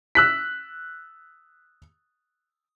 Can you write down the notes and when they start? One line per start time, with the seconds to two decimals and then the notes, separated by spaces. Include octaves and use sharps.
0.15 E6 F#6 B6